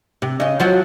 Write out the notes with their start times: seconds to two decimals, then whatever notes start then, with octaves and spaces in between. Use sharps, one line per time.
0.22 C3
0.40 C#3 D#5
0.60 F3 F#3 F#4